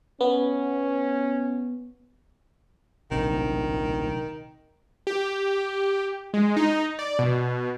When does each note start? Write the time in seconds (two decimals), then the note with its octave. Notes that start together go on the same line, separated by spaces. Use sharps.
0.21 B3 C#4
3.11 D1 A#1 C3 D#3
5.07 G4
6.34 G#3
6.57 D#4
6.99 D5
7.19 B2